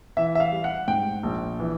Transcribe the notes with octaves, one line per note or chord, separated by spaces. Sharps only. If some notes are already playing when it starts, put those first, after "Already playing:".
E3 E5
E5
F5
G3
F#5
G#2 G5
A#1
E3